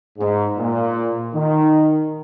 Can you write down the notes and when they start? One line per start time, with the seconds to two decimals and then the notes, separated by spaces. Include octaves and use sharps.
0.19 G#2
0.57 A#2
1.34 D#3